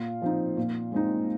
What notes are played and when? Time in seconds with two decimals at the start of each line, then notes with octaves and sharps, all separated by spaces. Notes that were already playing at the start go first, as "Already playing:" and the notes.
Already playing: A#2 F4
0.22 F3 C4 D#4
0.57 A#2
0.92 G#3 C4 D#4